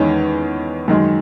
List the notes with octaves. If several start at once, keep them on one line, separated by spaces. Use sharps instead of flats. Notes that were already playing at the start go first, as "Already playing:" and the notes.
Already playing: E2 D#3 G#3 C#4
F#2 D#3 G#3